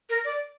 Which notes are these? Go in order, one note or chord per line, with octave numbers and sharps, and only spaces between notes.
A#4
D5